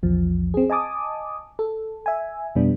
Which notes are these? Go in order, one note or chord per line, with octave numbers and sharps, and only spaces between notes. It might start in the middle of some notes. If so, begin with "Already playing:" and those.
A#1 E2 F3
C4 G#4
D#5 G#5 A5 D6 D#6
A4
E5 G#5
F2 B2 G3 B3 D4